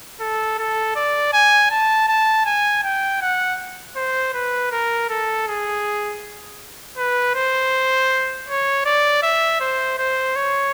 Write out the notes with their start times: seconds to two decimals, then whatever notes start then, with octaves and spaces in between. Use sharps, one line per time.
0.20 A4
0.58 A4
0.96 D5
1.33 G#5
1.71 A5
2.08 A5
2.46 G#5
2.84 G5
3.21 F#5
3.96 C5
4.34 B4
4.72 A#4
5.09 A4
5.47 G#4
6.97 B4
7.35 C5
8.48 C#5
8.86 D5
9.23 E5
9.60 C5
9.99 C5
10.36 C#5